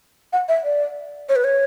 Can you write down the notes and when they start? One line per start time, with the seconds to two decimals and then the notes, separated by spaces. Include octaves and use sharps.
0.33 F#5
0.49 E5
0.64 D5
1.29 C#5
1.36 B4
1.44 C#5